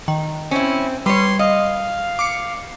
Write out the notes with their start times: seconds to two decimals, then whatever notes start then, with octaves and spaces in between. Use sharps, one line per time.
0.08 D#3
0.51 C4 C#4 E4
1.06 G3 B4 C#5 C6
1.39 D#5 F5
2.19 D6 C7 C#7